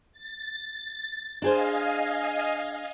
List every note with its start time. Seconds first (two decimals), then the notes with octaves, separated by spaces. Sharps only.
0.12 A6
1.42 D4 G#4 C5 D#5 F5 G#5